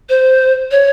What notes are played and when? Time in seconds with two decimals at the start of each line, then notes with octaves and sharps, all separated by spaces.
0.09 C5
0.71 C#5